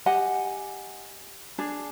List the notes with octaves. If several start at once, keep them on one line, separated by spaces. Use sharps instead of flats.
G4 D#5 F#5 G#5
D4 G#4